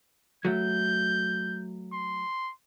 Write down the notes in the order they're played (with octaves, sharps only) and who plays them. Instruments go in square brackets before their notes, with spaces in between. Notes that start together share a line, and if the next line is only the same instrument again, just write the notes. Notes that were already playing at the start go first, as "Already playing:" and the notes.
[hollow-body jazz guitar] F#3 A3 [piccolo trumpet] G6
[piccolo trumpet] C6